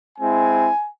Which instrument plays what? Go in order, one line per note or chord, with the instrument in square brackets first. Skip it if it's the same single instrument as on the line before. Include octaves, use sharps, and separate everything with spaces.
[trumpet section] G#3 C4 E4 G#5